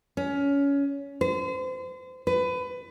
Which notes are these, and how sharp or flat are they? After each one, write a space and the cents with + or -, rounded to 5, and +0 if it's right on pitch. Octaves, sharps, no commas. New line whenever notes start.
C#4 +20
C5 -35
B4 +25